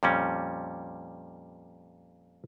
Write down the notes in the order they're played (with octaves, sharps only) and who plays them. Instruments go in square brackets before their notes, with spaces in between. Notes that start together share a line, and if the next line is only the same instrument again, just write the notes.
[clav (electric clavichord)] F2 A#2 G3 C#4